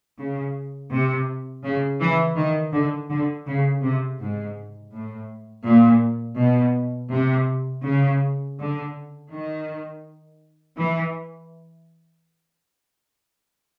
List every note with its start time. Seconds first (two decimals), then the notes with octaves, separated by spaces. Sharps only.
0.17 C#3
0.91 C3
1.63 C#3
2.00 E3
2.37 D#3
2.73 D3
3.10 D3
3.46 C#3
3.83 C3
4.19 G#2
4.93 A2
5.66 A#2
6.38 B2
7.12 C3
7.85 C#3
8.59 D3
9.31 D#3
10.78 E3